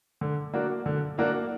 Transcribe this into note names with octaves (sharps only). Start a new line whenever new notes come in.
D3
F#3 A#3 D4 F#4
D3
F#3 A#3 D4 F#4